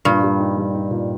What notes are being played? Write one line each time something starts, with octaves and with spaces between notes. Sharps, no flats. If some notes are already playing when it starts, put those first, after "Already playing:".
G2 A#2
G3
D#4
G3
D#4
A#2